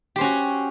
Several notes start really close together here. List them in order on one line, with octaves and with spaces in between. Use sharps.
G4 C5 C#4 F#4